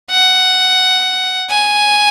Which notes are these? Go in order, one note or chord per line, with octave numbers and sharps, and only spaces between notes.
F#5
G#5